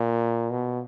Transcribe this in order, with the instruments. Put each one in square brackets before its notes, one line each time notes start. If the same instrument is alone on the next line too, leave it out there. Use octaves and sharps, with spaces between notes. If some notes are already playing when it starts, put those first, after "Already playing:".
Already playing: [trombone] A#2
B2